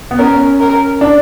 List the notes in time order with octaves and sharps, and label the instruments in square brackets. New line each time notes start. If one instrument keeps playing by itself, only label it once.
[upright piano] B3
[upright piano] C#4 [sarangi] A#4
[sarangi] A#4
[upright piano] D4